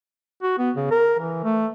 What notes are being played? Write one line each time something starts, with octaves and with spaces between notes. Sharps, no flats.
F#4
B3
C#3
A#4
E3
A3